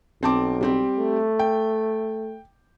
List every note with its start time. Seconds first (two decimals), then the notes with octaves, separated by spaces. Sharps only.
0.23 B1 C4 A5 D6
0.61 G3 C4 G4
0.99 A3
1.39 G5